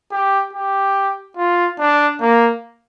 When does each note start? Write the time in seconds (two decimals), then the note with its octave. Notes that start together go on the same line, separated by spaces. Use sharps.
0.12 G4
0.53 G4
1.37 F4
1.79 D4
2.20 A#3